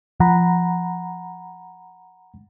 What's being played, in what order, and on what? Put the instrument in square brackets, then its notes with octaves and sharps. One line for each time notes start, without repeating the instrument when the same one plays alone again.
[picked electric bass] F3 [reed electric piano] F#5 A#5 B5